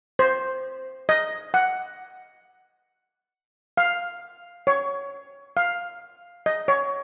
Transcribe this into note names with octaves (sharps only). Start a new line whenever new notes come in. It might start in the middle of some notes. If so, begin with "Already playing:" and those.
C5
D#5
F#5
F5
C#5
F5
D#5
C#5